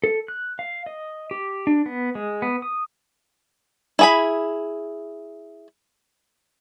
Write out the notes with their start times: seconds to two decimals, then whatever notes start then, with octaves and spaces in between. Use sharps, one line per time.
0.04 A4
0.28 F#6
0.59 F5
0.86 D#5
1.31 G4
1.67 D4
1.86 B3
2.15 G#3
2.42 B3
2.62 D#6
3.99 E4 G#4 B5